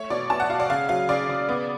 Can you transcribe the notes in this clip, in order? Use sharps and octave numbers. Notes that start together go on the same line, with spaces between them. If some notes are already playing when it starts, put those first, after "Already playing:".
Already playing: A3 C#5
B2 D5
B2 A5
F#5
B2 F5
D5
C#3 F5
F#3 F5
C#3 D5
C#3
B3